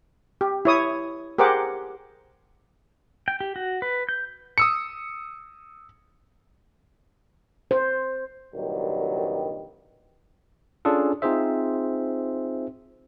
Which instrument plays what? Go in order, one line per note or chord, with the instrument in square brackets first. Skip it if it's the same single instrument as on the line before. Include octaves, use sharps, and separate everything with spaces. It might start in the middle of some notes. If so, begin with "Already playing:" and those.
[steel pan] G4
E4 C#5 D#6
G4 G#4 A#4 C5 F#5 D6
[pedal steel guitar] G5
G4
F#4
B4
G6
[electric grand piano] D#6 E6 C#7
[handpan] C5
[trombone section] C2 G2 A#2 D#3 F#3 G3
[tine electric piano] C#4 D4 F4 G#4 A4
C4 D#4 F4 G#4 C5 E5